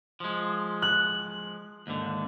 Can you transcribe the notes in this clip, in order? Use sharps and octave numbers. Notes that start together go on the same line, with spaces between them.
F3 G#3
F#6
D#2 G#2 D3